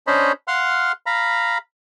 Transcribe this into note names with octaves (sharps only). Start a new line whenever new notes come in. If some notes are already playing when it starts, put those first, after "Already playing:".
C#4 D4 C5 C#5 D#5 B5
F5 F#5 C6 F6
F5 A#5 B5